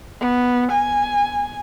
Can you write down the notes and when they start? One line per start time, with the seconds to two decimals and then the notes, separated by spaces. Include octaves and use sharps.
0.21 B3
0.71 G#5